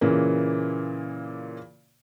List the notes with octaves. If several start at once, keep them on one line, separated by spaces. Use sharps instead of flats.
A#2 C#3 E3 A#3